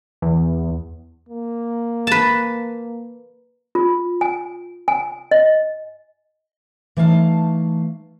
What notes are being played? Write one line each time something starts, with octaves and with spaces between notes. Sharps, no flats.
E2
A#3
B4 A5
F4
G#5
G#5
D#5
E3 A3 D#4 F5 A5